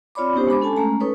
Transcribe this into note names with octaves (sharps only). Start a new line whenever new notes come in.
C4 F4 C#5 D5 B5 D6
B3 C#4 D#4 G4 C5
G#3 D4 B5 D6
C#4 A4 G#5 A5
G#3 A3 C#4 A#5
C#4 D#4 A4 B4 C#5